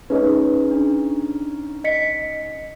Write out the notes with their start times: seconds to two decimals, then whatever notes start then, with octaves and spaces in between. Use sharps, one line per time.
0.10 C#4 D#4 G#4 B4
0.71 D4
1.84 D#5 B6 C#7